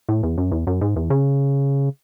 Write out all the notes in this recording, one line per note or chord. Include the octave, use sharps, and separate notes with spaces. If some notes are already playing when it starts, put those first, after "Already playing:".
A2
E2
F#2
E2
F#2
G#2
E2
C#3